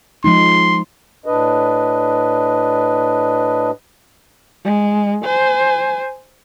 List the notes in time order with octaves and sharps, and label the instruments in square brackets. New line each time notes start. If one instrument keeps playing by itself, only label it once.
[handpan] F3 G#3 D#4 [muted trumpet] C6
[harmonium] A2 D4 B4 D#5
[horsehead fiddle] G#3
C5 G#5